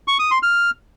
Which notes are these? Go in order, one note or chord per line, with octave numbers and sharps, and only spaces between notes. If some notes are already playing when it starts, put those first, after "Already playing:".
C#6
D#6
C6
F6